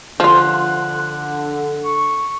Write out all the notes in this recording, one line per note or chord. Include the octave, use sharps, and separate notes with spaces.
D3 F3 F4 F#6
C#6